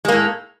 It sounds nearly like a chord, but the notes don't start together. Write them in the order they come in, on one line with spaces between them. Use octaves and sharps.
G#3 A#3 A2